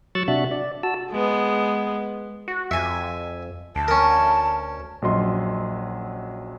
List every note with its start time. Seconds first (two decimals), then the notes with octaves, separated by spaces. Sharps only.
0.15 F#3 C#6 E6 F#6 A6
0.28 C3 D4 F#4 E5 F#6
0.51 D5
0.83 F#4 A5 E6
1.11 G#3 B3
2.48 F#4
2.71 F2 E5 G#5
3.76 D2 A5
3.88 C#4 A#4
5.02 A#1 F#2 F#3 D#5 C6